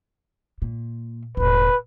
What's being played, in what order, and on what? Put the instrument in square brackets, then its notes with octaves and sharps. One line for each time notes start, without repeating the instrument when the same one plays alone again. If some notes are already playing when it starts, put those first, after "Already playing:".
[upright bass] A#2
[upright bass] E1 A2 [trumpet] B4